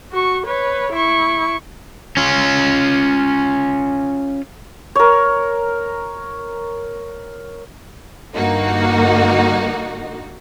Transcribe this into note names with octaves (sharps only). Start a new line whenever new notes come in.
F#4 C#6
B4 C#5
E4 C#6
C#4 F4
A#4 C#5
G2 D3 A#3 D#4 F#4